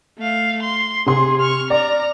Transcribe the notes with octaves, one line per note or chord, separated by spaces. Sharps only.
A3 F5
C6
C3 G#4 C6
C#6 F6
D5 A#5 F6